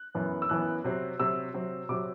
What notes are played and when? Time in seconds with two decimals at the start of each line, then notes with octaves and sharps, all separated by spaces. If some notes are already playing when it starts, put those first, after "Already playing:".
Already playing: F#6
0.15 F#2 E3 B3
0.42 E6
0.49 F#2 E3 B3 F#6
0.84 C3 F#3 C4
1.19 C3 F#3 C4 E6
1.54 C3 F#3 C4
1.89 C3 F#3 C4 D6